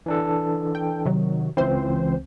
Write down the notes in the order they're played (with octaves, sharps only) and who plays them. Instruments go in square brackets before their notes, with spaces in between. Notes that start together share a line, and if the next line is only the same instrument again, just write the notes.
[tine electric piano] E3 D4 A4
[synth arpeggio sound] G5
C3 D#3 F#3
[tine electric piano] C#2 C4 [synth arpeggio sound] E3 C5